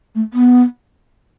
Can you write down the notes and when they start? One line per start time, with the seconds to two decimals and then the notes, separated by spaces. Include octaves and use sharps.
0.15 A3
0.34 B3